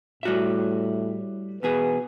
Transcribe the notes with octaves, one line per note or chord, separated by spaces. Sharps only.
A2 G3 F#4 E5
E2 B2 G#4 B4